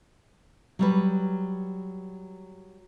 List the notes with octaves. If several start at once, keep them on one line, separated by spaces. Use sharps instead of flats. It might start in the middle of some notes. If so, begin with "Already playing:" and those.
F#3 G3 B4